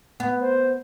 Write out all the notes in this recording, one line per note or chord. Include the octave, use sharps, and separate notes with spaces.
B3
C5